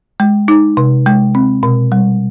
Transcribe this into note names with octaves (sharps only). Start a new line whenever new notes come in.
G#3
D#4
C3
G#3
C4
B2
G3